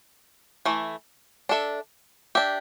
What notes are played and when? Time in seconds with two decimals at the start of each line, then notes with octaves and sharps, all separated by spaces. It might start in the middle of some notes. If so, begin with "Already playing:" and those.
0.65 E3 A3
1.49 D4 A4 E5
2.35 D4 G4 E5